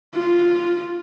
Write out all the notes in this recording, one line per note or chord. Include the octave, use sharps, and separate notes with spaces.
F4